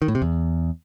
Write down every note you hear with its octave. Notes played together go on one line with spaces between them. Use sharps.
D#3
A2
C3
E2